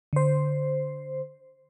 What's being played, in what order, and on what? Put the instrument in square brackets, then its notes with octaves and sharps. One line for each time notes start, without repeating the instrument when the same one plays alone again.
[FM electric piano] D3 C5